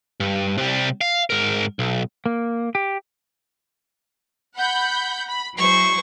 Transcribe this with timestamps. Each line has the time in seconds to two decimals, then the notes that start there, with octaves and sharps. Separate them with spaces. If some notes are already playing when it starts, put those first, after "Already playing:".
0.20 G2
0.58 C3 G3
1.01 F5
1.30 G#2 A#4
1.79 B1
2.26 A#3
2.75 G4
4.56 F#5 B5 G6
5.28 B5
5.58 F#3 G#3 E4 C5 C#6